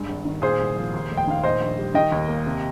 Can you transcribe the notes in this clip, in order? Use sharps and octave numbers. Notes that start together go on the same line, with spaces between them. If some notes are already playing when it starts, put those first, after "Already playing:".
Already playing: G2 G#3
G#1
D#3
A#2 G#4 C5
C2
F3
D#2
F1
G5
D#3 F5
A#2 C5 D#5
A#1
G3
D#3 D#5 G5
D#2
A#3
C3